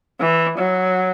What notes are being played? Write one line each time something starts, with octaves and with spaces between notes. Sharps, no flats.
E3
F#3